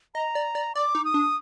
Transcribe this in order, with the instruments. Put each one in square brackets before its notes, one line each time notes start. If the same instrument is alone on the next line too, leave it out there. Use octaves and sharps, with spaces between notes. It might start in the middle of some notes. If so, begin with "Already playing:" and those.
[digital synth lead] D#5 [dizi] A#5
[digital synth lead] D5
D5
[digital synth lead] D5 [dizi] D6
[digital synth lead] D#4
[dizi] D#6
[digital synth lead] D4